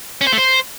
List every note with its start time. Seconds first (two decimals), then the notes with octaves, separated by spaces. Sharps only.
0.21 C#4
0.27 C5
0.32 A3
0.38 C5